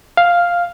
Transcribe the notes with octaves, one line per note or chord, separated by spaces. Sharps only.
F5